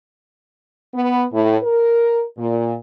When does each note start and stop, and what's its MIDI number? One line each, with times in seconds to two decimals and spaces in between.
0.94 1.26 59
1.33 1.57 45
1.63 2.24 70
2.38 2.76 46